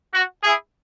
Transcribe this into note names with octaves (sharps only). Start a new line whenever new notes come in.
F#4
E4 G#4